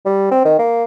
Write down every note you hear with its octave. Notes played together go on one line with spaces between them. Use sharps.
G3
C4
D#3
A#3